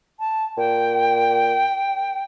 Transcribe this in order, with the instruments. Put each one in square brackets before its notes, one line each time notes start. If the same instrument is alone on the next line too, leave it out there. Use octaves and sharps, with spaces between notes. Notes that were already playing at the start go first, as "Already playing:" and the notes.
[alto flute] A5
[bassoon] A#2 [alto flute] G5